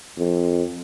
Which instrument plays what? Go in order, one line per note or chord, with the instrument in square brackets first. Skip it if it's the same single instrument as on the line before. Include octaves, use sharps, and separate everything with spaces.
[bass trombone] F2